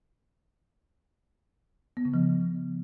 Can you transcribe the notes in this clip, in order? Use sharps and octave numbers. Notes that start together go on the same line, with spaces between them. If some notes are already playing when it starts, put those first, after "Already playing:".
B3
C#3
F3